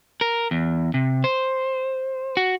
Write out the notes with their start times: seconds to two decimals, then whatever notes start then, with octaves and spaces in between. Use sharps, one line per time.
0.21 A#4
0.51 E2
0.94 C3
1.24 C5
2.37 F#4